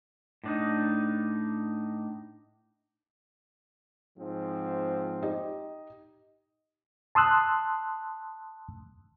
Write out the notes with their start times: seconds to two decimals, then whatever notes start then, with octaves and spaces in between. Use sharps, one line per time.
0.44 A2 D4 D#4
4.18 G#2 F3 C4
5.22 D#4 G4 D#5
7.15 A5 C6 D#6 E6 F#6